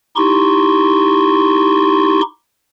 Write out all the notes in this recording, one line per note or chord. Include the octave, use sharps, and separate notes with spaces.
D#4 E4 G4 C6 C#6